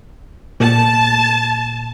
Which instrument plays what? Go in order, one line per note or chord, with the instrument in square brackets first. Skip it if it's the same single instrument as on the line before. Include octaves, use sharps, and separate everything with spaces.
[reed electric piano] A#2 [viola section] A5